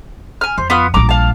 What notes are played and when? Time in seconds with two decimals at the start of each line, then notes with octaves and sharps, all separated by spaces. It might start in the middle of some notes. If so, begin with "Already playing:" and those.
0.41 G#5 F6
0.58 F2 C5
0.70 B3 F4 D#6
0.94 A#1 G3 A#5 D6
1.09 F5 A5